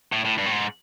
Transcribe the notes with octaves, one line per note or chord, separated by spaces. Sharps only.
A2
A2
G2
A2
G#2